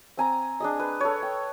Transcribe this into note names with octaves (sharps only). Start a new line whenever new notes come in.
C4 G#5 A#5
D4 G#4 D#5
B4
A4 C#5
G5